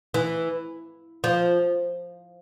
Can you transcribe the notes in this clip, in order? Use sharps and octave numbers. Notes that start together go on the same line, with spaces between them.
E3
F3